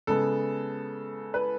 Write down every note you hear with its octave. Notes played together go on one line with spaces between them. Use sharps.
C#3 G#3 B3 A4
B4